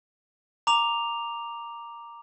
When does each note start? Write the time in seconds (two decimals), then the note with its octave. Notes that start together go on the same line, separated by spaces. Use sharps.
0.67 A#5 D6 F7